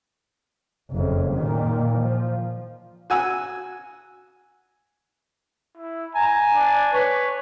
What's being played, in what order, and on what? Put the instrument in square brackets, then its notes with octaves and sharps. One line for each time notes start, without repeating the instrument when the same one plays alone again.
[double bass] F#1 F2
A#2 D#3
F3
[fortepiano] F#4 G#5 E6
[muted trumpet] E4
[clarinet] G#5 [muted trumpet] A#5
[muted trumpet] D4
[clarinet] B4 [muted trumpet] C#5